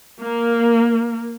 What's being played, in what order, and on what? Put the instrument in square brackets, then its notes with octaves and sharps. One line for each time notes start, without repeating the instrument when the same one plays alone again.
[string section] A#3